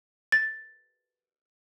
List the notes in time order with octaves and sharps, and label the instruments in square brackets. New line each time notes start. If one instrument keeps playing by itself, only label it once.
[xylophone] A6